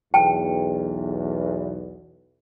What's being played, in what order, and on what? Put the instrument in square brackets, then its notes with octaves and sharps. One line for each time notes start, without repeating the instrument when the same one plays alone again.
[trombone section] B1 E2 [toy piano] G5 A5